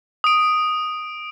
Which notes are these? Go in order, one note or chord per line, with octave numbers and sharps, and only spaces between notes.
D#6 D7